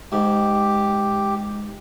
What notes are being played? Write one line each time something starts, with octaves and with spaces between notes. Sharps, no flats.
G#2 G4